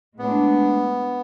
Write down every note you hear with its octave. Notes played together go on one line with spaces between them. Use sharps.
A2 G#3 B3 D4